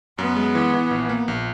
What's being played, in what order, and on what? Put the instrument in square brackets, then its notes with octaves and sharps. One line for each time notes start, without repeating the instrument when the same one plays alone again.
[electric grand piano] F#2 [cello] B3
[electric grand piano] G#3
E3
E3
A#1
A#3
A#1